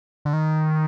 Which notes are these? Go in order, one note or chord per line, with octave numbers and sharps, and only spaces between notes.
D3
D#3